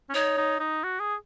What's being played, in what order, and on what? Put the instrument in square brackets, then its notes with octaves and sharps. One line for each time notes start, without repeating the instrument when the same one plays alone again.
[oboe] C#4
[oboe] D#4 [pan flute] C#5
[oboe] D#4
D#4
F#4
G#4